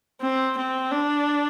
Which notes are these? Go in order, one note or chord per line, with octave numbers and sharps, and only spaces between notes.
C4
C4
D4